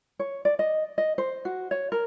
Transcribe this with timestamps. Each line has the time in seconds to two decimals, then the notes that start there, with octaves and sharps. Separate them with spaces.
0.19 C#5
0.45 D5
0.59 D#5
0.98 D#5
1.18 C5
1.45 F#4
1.71 C#5
1.92 A#4